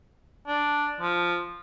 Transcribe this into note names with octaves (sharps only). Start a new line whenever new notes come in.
D4
F3